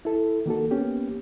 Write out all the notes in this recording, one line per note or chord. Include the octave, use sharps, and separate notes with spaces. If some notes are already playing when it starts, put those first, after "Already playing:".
E4 A4
D#3 A#3 F#4 A4
A#3 B3 C#4 G4